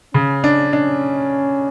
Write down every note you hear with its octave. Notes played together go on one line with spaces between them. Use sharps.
C#3 C#4
D4
C#4 D4